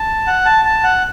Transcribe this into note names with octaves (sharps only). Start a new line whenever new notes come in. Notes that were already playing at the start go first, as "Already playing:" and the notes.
Already playing: A5
F#5
A5
A5
F#5